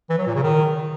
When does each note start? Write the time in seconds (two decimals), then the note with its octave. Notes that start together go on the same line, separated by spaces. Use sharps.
0.10 E3
0.18 F#3
0.27 A#2
0.35 C#3
0.43 D#3